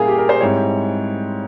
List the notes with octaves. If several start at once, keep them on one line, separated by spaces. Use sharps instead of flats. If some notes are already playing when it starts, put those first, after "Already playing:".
Already playing: A#2 G3 C#4 E4 G#4 A#4 F5 G5
G4
A#4
C5
G#2 G3 C4 E4 C#5